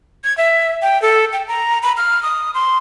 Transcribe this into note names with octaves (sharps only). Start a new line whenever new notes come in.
G#6
E5
G5
A4
G5
A#5
B5
F6
D#6
C6